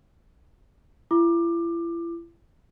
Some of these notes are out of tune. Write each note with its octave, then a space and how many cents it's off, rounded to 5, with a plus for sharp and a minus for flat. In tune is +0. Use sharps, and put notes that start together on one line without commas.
E4 +40 D6 +20